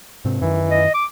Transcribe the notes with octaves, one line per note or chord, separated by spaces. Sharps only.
G#2 C3 C4
F#2 D#3 E3
D#5
D6